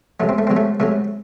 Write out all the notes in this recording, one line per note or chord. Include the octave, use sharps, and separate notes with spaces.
C#2 C3 F#3 A3
C4
A3
C#2 C3 F#3 C4
A3
C#2 C3 F#3 A3